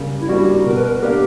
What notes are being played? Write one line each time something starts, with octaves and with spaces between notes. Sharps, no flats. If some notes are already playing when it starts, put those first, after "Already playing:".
Already playing: C#3 G3 A#3
E4
G3 A#3 D4 F#4
B2 A#4
B4
A#4
A#3 D4 G4 A#4